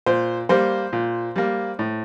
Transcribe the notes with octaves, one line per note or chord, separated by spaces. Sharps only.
A#2 C5
G3 A#3 C5
A#2
G3 A#3
A2